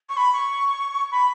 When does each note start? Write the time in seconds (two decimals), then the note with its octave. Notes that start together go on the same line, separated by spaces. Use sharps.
0.09 C#6
0.17 B5
0.33 C#6
1.11 B5